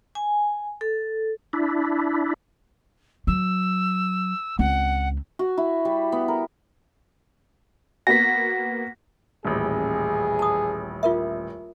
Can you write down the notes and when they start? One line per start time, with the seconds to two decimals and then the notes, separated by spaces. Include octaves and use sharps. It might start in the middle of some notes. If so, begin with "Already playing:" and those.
0.15 G#5
0.81 A4
1.53 D4 E4
3.27 F#3 E6
4.59 C#2 C4 F#5
5.39 F#4
5.57 E4
5.85 G3
6.12 B3
6.28 A#4
8.07 A#3 B3 F#4 A#6 B6
9.45 D#1 A1 G#4
10.39 A5 D#6
11.03 F4 A#4 E5